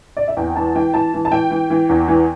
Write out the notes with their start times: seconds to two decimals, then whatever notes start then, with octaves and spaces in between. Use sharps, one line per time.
0.17 D5
0.28 E5
0.37 E2 G5
0.56 E3 A5
0.75 E3 G5
0.94 E3 A5
1.14 E3
1.25 A5
1.32 E3 G5
1.51 E3
1.70 E3
1.89 E2
2.08 E3